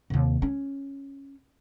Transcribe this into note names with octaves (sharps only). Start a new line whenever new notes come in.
D#2 C3
C#4